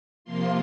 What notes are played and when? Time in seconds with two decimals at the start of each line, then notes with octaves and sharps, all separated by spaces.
0.25 C3 F3 A#3 F4 C6